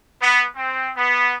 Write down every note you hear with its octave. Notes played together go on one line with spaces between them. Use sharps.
B3
C4
B3